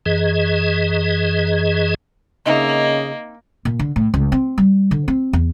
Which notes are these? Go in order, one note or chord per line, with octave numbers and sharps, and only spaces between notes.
F#2 E3 G#4 D#5
C#3 A#3 C4 D#4 D#5 E5
A#2
D3
A2
C#2
C4
G3
D3
C4
E2